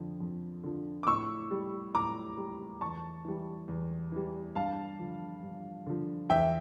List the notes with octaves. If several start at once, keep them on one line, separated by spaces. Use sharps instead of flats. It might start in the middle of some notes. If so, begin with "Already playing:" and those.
Already playing: F2 D3 F3
F2
D3 F3
D6
A2 C#6 E6
G3
A2 A#5 D6
G3
E2 A5 C#6
E3 G3
E2
E3 G3
G2 F5 A5
D3 F3
G2
D3 F3
E2 E5 G5